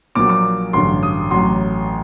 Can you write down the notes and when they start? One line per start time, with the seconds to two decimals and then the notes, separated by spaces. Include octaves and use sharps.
0.15 A#1 A#2 F#3 D6
0.29 D6
0.73 A1 G2 D3 F#3 C6
1.03 D#6
1.31 A1 A2 F#3 C6